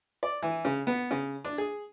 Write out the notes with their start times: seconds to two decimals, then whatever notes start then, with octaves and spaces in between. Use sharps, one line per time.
0.23 D5
0.42 E3
0.65 C#3
0.87 B3
1.11 C#3
1.45 D4
1.58 G#4